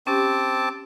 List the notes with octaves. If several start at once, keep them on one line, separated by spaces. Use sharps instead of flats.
C4 C#4 G4 A5 D6